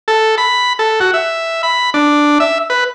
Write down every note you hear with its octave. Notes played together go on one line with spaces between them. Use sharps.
A4
B5
A4
F#4
E5
B5
D4
E5
B4